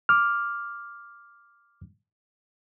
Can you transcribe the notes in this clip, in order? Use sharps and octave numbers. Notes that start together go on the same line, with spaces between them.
D6 F6